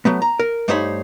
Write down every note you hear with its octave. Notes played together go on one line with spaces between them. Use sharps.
F#3 A3 B3
A#5
A#4
G2 A3 D#4 C5 C#5 B5